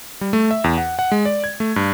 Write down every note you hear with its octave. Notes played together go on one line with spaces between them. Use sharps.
G3
A3
E5
E2
F#5
F#5
G#3
D5
G#6
A3
G2